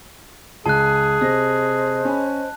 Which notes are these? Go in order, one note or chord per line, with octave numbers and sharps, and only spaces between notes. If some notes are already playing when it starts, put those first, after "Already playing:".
C#2 G#4 A5 F#6
C3 C5 D#5 A#6
C#4 G#5 B5